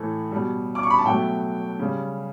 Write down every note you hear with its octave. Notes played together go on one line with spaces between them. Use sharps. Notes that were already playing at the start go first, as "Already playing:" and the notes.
Already playing: A2 E3 A3
B2 G3
D6
C#6
B5
A5
B2 F#3 A3 G5
C#3 G3